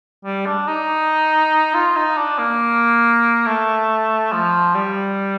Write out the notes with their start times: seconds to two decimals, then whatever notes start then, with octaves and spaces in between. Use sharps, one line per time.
0.24 G3
0.46 D4
0.67 D#4
1.74 F4
1.96 D#4
2.17 D4
2.38 A#3
3.46 A3
4.32 F3
4.74 G3